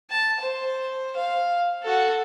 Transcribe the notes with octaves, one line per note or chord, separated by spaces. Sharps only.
A5
C5
F5
F#4 A4